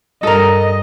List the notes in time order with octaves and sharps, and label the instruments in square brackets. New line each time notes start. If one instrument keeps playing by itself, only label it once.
[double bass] G2 [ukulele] A4 A#4 [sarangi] D#5